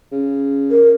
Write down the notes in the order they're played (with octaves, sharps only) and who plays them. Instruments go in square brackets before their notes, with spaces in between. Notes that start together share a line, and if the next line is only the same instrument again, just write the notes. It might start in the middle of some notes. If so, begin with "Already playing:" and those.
[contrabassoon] C#3
[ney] A#4